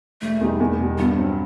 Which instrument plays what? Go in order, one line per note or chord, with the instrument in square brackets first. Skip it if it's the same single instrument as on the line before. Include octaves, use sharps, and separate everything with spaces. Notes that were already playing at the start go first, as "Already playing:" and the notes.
[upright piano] E1 [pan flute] A3
[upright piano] E2 B2 G3 D#4
E2
B2 G3
[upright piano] G2 [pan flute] B3
[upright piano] F#3 C4